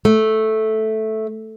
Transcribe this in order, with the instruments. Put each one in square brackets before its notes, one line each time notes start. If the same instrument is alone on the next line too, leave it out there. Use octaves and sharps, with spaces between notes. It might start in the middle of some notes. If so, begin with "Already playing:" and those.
[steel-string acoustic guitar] A3